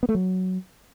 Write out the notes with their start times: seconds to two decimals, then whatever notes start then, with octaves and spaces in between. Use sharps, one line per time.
0.03 B3
0.09 A3
0.15 F#3